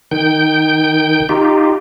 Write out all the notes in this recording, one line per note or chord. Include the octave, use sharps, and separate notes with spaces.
D#3 G5 G6
D#4 F4 G4